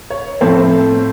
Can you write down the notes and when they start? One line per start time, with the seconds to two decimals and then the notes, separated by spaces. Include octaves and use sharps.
0.10 C#5
0.41 A2 F3 A3 C4 C5